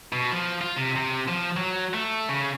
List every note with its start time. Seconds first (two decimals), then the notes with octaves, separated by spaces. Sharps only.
0.13 B2
0.32 F3
0.61 F4
0.76 C3
0.96 C3
1.28 F3
1.57 F#3
1.94 A3
2.29 C#3